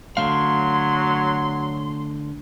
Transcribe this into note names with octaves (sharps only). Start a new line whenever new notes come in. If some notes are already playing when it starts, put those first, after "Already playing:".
D3 F#3 A3 F5 C6